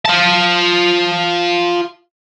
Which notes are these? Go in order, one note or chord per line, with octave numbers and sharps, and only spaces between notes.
F4 A5